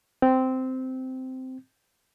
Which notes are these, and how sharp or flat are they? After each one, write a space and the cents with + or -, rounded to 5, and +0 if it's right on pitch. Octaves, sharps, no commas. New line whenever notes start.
C4 -10